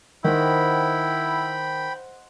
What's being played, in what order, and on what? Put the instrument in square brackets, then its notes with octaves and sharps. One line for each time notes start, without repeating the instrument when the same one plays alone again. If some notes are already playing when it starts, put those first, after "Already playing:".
[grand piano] D#3 [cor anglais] E4 [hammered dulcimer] C5 D#5 F#5 [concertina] G5 B5